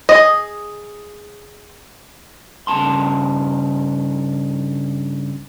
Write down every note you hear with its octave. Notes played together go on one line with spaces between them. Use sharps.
G#4 D#5
G2 C#3 D4 A5 C6